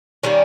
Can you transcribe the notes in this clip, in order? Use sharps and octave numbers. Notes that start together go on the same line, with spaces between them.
D#3 G3 A#3 C#4